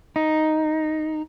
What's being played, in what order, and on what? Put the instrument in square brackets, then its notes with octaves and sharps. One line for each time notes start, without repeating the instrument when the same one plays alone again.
[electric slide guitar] D#4